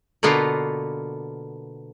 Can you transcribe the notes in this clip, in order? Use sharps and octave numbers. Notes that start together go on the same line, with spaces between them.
B2 D3 A#3 B3 F4